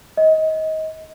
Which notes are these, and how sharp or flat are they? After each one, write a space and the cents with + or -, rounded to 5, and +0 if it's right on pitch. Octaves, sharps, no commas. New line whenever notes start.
D#5 +25